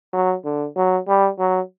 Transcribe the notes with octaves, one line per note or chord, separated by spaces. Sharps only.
F#3
D3
F#3
G3
F#3